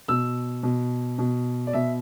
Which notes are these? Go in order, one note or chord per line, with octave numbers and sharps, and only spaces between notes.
B2 E6
B2
B2
D5
B2 E5